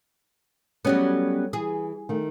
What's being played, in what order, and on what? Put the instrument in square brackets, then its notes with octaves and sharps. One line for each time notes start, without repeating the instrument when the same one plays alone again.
[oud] F#3 G3 B3 [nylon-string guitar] A3 C#4 G#4
[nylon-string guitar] E3 [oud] G#4
[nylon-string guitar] D#3 A3